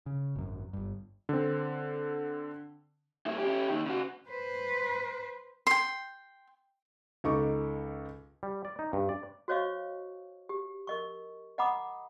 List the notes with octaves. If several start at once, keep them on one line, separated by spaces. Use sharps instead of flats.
C#3
G#1 F#2
G1 G2
D3 C4
G2 E4
C#4 G4
D#2 D#3
C#3 F#4
B4 C5
G5 C6
C#2 D#4 A4 C#6 D6
G3
D5
D#4
G2
D5
F#4 C5 C#5 D#5 F5 C#6
G4
A#4 D#5 C#6
D#5 F#5 A#5 B5 D6 D#6